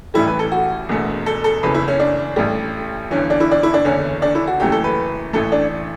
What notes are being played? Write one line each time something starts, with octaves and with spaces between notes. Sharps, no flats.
A1 A2 E3 G3 E4
B4
A4
F#4
E1 E2 B2 A3
A4
A4
F#1 E2 C#3 E3 B4
E4
C#4
D4
A1 A2 G3
G1 G2 E3 C#4
D4
E4
D4
E4
D4
F#1 E2 D3 C#4
D4
E4
F#4
F#1 F#2 E3 A3 G4
A4
B4
A1 A2 E3 A3 A4
D4